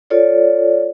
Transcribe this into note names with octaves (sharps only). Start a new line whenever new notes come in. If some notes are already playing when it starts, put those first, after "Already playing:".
F4 A4 C#5 D5